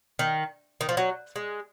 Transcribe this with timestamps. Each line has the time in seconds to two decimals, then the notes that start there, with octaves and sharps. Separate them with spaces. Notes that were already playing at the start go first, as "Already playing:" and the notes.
0.19 D#3
0.81 D#3
0.89 F3
0.97 F#3
1.36 G#3